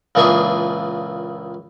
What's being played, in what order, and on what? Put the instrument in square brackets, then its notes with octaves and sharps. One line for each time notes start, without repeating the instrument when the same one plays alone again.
[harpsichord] C#2 A#2 E3 D4 G#4 E5